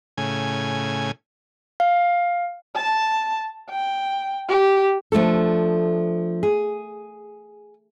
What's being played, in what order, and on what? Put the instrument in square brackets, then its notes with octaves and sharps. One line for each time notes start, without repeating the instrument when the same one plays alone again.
[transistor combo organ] A2 C#3 G#5
[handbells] F5
[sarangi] A5
G5
G4
[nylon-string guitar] F3 A3 D4 A4
G#4